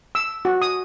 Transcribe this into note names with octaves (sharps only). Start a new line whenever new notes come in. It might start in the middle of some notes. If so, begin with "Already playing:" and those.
E6
F#4
D#6